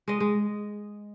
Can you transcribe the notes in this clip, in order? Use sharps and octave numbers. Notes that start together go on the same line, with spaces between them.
G#3 D#5
G#3